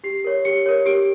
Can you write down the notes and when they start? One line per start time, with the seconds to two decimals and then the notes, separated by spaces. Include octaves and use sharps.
0.04 G4 C7
0.24 A#4 C#5
0.45 G4 C#7
0.66 A#4 C#5
0.86 G4 D7